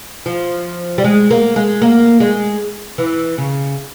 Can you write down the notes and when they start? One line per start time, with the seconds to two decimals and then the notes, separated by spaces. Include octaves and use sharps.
0.26 F3
0.98 G3
1.04 G#3
1.31 A#3
1.56 G#3
1.82 A#3
2.20 G#3
2.98 E3
3.38 C#3